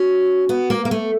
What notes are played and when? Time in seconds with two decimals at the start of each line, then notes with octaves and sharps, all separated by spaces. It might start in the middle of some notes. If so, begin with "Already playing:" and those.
Already playing: C#4 F#4
0.49 B3
0.70 A#3
0.85 A#3
0.91 A3